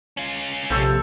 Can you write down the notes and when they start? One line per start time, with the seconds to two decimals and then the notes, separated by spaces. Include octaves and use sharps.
0.17 C#4 F4
0.70 A#1 C3 C4 A4 C#5